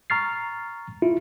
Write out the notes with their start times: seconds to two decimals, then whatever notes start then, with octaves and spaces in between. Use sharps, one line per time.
0.10 A#5 C#6 F6 A6 C7
1.02 E4 F4